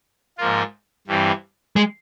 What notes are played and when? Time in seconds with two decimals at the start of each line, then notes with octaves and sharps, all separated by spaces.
0.38 G#2 F3 A#3 F4
1.07 G2 E3 G3 C4
1.76 G#3